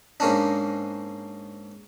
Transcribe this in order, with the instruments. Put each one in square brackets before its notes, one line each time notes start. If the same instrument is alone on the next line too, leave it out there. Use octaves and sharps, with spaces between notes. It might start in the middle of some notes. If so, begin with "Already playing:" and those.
[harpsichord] G#2 A#3 C#4 D4